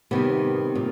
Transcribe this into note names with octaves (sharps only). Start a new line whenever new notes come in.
C3 D#3 G3 B3
A#2